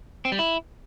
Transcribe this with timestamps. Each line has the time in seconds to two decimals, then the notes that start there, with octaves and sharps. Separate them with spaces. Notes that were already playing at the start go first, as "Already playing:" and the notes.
0.25 C4
0.32 G3
0.39 E4